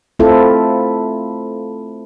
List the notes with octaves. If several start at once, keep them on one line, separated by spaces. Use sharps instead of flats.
A3 C4 E4 F4 A4